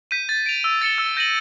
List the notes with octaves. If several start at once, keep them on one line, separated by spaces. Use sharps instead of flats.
G6 B6 D#7
A6
D7 F7
E6
A6 C#7 E7 G7
E6
G6 A#6 D#7 F#7